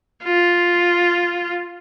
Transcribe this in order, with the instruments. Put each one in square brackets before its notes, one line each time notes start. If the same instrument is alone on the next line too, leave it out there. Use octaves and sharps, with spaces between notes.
[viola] F4